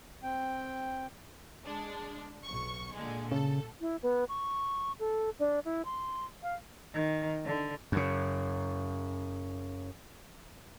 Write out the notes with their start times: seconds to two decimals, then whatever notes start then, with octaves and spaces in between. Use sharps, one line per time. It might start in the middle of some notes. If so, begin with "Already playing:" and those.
0.23 C4 G5
1.64 G#3 D4
2.44 B1 C#6
2.96 A#2 D3 G#3
3.32 C#3 A4
3.81 E4
4.03 B3
4.28 C#6
4.99 A4
5.39 D4
5.65 E4
5.85 C6
6.43 F5
6.93 D#3
7.45 D3
7.92 F#2 C#3